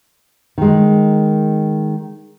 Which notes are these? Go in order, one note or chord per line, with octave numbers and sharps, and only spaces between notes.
D#3 G#3